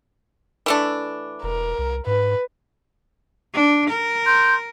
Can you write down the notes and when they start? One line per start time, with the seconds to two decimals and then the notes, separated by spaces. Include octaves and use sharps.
0.66 E3 A3 D4
1.43 E1 A#4
1.78 C2
2.07 G#2 B4
3.53 D4
3.89 A#4
4.26 C6 G6